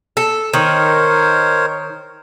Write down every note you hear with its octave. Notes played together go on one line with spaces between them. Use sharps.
A4
D#3 A#4 C5 C#5